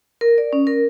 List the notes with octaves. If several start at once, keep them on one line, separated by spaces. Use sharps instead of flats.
A#4
D5
C#4
A#4